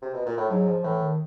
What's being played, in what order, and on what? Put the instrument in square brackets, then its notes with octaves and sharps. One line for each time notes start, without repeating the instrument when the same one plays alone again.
[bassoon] C3
B2
A#2
A2
[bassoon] G#2 [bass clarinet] F#3
[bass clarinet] F3
[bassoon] A2 [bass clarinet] E3
[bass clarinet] D#3